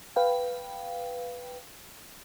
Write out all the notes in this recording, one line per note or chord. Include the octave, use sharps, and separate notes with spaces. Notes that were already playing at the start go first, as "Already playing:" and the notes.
B4 F5 G5